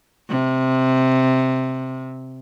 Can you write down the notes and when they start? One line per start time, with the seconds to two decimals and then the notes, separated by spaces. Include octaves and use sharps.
0.30 C3